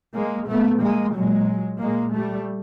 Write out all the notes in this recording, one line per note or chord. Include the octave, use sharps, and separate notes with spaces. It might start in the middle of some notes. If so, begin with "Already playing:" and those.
G#3 A#3
A#2 A3 B3
G#3 A#3
A#2 F#3 G#3
A#2 G#3 A#3
G3 A3